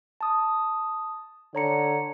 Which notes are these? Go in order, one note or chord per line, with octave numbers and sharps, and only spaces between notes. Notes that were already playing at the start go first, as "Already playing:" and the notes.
A5 D#6
D3 C#5 A#5 C#7